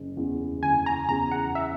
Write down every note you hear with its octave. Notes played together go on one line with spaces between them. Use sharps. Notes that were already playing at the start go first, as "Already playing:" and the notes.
Already playing: F#1
E2 C#3
F#1 G#5
A#5
E2 C#3 A#5
F#5
E5